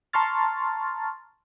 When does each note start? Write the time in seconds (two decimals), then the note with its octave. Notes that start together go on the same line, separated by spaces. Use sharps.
0.13 A5 A#5 C6 C#6 F6 A6